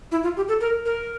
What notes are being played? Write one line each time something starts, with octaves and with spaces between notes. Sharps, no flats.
E4
F4
G4
A4
A#4
A#4